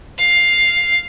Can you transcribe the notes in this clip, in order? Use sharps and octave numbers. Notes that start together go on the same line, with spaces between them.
F5